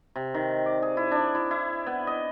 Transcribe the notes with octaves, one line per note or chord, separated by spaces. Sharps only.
C3
D#3
D5
G#4
E4
D4
E4
E4
B3
D#5